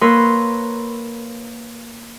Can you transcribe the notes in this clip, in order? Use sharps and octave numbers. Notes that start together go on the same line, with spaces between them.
A#3 A#4 B4 C#5 C6 E6